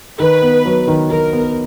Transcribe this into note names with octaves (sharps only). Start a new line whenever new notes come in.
D#3 B4
B3
F#3
D#3
D#3 A#4
B3